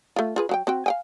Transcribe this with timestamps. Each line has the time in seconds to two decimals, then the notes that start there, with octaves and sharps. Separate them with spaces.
0.16 A3 F4
0.36 F4 G#4 B4
0.49 F#3 F#4 G5
0.67 C4 F#4 G5
0.86 F5 G5 G#5